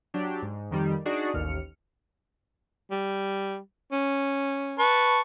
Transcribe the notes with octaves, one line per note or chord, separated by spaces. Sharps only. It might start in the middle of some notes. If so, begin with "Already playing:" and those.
F#3 D4 G4
G#2
F2 D#3 G3
D4 D#4 F#4 G#4 D5
A1 D#2 F6 C#7
G3
C#4
B4 A5 C#6